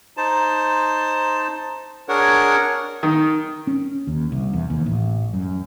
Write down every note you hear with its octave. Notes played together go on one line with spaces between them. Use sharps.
D#4 C5 A5
D4 G#4 A#4 C#5 F#5
D#3
C#4
D#2
C2
E2
D#2
A1
F#2